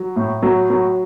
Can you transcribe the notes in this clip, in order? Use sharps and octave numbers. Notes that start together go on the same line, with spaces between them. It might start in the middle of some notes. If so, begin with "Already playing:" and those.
Already playing: F#3
A2
F#3
F#3